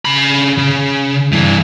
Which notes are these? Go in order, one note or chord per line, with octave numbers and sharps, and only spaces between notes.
C#3 B5
C#3
G2 E3